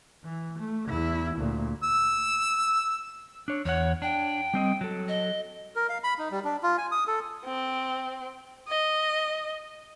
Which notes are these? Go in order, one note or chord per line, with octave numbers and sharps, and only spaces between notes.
E3
A3
E2 E4
D2 A#2
E6
D4 C#5
E2 C#5 F#5
D4 G5
G3 C4 D#5
F#3 A4
D#5
A#4
F5
B5
D#4
G3
D4
F4
G#5
D#6
A4
C4
D#5